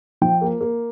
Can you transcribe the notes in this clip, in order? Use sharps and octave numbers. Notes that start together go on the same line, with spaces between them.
F3 G5
A#3
A#3